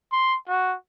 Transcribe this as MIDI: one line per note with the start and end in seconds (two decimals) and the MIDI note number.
0.12 0.35 84
0.48 0.75 66